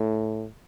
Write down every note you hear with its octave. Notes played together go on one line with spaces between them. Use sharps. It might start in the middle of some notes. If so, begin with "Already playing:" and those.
Already playing: A2